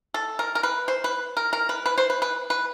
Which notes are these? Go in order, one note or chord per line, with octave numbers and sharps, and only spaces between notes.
A4
A#4
A#4
B4
C5
B4
A#4
A#4
B4
B4
C5
B4
B4
B4